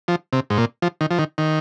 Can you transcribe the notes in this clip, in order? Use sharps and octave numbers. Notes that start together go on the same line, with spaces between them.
F3
C3
G#2
A#2
F3
D#3
F3
D#3
D#3